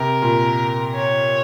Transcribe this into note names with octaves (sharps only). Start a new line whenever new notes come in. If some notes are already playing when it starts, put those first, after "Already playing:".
Already playing: C3 A#4
A#2
C#5